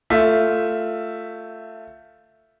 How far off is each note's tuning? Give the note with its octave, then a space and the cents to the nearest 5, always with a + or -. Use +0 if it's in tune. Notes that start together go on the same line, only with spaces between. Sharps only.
A3 +15 F4 +0 E5 +0